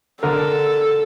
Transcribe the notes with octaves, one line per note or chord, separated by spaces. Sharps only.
D3 A4 A#4